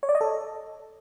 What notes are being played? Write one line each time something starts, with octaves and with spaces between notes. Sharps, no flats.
C#5
D5
D#5
A4